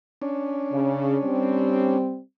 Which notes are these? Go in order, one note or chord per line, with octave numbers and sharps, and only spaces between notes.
C#4 D4
C#3
G3 C4